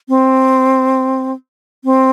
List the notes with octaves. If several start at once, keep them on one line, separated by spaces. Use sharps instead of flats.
C4
C4